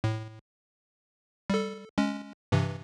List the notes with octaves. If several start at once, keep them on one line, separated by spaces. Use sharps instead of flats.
A2
G3 A4
G#3 C#4
G2 C3 E3